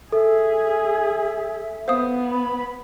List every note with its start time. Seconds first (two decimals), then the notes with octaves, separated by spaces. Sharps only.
0.12 G#4 A4 E5
1.88 B3 C5 F5 D#6
2.31 B5